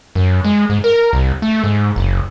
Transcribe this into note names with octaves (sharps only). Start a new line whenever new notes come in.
F#2
G#3
G#2
A#4
C2
A3
G#2
F#1